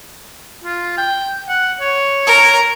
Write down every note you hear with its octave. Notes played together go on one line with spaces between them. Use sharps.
F4
G5
F#5
C#5
A#4